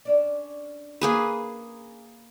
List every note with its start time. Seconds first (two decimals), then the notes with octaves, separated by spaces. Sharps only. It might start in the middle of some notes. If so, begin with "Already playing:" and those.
0.05 C#4 D4 D5
1.01 A#3 G#4 B4